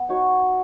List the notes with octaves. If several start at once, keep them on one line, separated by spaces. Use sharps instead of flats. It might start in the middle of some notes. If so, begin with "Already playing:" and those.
Already playing: B3
D#4 F#4 C#5